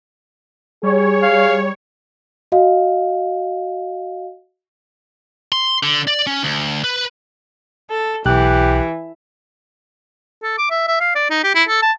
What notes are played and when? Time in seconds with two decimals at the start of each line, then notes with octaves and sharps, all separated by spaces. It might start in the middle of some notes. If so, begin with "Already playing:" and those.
0.83 G3 G#4 C#5
1.23 F5
2.52 F#4 D#5 F5
5.52 C6
5.83 D3
6.07 D5
6.27 C#4
6.43 D2
6.84 B4
7.90 A4
8.26 B1 E3 G4 F#6
10.43 A4
10.58 D6
10.71 E5
10.87 E5
11.01 F5
11.15 D5
11.30 D#4
11.43 G4
11.55 E4
11.68 A4
11.82 A5